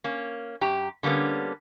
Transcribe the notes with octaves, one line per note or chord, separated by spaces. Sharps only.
A#3 C#4
F#2 G4 A#5
D3 G3 A#3 B3 C#4